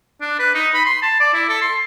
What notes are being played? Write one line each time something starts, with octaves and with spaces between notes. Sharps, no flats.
D4
B4
D#4
B5
C6
A5
D5
E4
A4
C6